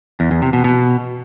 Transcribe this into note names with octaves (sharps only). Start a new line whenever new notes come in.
E2
E2
C3
B2
B2